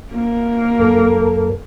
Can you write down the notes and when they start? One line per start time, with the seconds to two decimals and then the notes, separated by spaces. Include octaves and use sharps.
0.13 A#3
0.79 F#2 A4 A#4